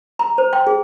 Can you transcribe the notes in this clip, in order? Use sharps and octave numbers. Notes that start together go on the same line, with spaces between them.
A#5
C5
G5
G#4